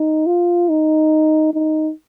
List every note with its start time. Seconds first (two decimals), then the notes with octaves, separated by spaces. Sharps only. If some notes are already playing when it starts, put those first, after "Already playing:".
Already playing: D#4
0.26 F4
0.69 D#4
1.54 D#4